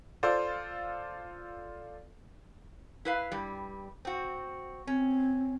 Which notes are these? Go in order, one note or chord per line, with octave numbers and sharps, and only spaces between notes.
F4 A4 C5 D5
E4 B4 F5
G2 G3
C4 F#4
C4 C#4